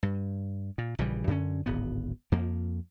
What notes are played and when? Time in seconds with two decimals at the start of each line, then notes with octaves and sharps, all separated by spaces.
0.03 G2
0.78 A#2
0.99 A#1 C#3 E3 G3
1.27 F#2 D3 B3 C#4
1.66 D1 G#1 B3
2.32 F2 F3 A#3